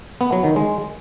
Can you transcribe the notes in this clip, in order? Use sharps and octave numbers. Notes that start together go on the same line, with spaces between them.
B3
F#3
D#3
G#3